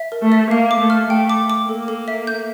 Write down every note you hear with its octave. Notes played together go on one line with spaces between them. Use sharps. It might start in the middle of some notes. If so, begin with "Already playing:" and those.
Already playing: E5
A#4
A3
E5
A#3 F5
D6
A3
F6
A3 G5
D6
D6
A#3 A4
A4
E5
G6